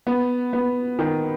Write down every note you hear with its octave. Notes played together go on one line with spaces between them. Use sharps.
B3
B3
D#3